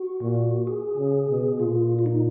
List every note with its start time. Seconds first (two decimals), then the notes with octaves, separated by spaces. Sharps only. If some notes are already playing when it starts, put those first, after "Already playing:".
Already playing: F#4
0.21 A#2
0.67 G#4
0.97 C#3
1.29 B2
1.59 A#2 F4
1.99 F4
2.06 D#4